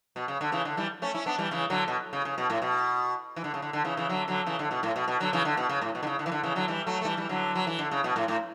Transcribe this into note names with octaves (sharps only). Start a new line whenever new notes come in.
B2
C#3
D3
C#3 E3
D3
E3 G3
A3 C#4
C#4 E4
B3 D4
E3 G3
C#3 E3
D3 F#3
B2
C#3
C#3
B2
A2
B2
E3
D3
C#3
D3
D3
C#3 E3
C#3 E3
D3 F#3
D3 F#3
C#3 E3
D3
B2
A2
B2
B2
D3 F#3
C#3 E3
D3
B2
C#3
A2
B2
D3
C#3
D3
E3
D3
C#3 E3
D3 F#3
E3 G3
F#3 A3
A3
E3 G3
E3 G3
D3 F#3
F#3
E3
D3
C#3
B2
A2
A2